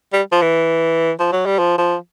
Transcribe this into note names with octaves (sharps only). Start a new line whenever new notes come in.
G3
F3
E3
F3
F#3
G3
F3
F3